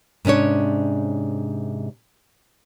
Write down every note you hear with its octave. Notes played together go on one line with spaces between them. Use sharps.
G#2 C3 C#4 D4 C#5